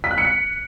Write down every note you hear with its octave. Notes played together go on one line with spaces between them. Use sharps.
B6
F#6
C#7
B6